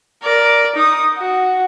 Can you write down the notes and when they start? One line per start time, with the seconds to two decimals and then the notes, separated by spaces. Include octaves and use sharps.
0.23 A#4 D5
0.75 D#4 D#6
1.18 F#4